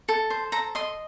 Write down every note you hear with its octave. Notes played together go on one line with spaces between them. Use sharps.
A4
C5
A4 A#5
D#5 C6